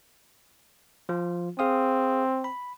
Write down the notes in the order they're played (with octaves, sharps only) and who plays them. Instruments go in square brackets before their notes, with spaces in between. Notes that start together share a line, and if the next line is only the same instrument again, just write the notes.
[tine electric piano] F3 F4
[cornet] C4 [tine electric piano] G#4 F5 D#6
[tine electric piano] B5